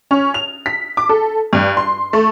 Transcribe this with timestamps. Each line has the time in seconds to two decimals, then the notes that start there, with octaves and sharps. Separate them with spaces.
0.11 C#4
0.34 F7
0.66 B6
0.97 D6
1.09 A4
1.53 G2
1.77 C6
2.13 A3